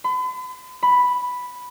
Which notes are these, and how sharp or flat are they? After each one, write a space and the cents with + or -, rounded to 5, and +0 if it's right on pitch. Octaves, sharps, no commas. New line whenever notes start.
B5 +45
B5 +0